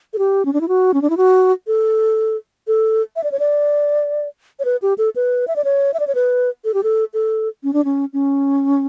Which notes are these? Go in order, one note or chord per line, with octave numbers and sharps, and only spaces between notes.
A4
G4
C#4
D4
E4
F#4
C#4
D4
E4
F#4
A4
A4
E5
D5
C#5
D5
C#5
B4
G4
A4
B4
E5
D5
C#5
E5
D5
C#5
B4
A4
G4
A4
A4
C#4
D4
C#4
C#4